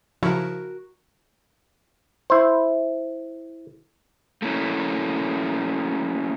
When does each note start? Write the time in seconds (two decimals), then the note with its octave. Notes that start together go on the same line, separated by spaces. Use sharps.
0.23 C#3 F3 E4 F#4 A#4
2.30 E4 C5
4.42 A3 A#3 C#4 E4